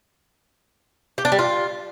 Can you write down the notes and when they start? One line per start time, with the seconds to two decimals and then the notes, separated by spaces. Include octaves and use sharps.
1.18 G4
1.25 D4
1.32 G3
1.39 F4